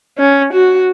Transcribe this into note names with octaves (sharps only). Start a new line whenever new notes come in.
C#4
F#4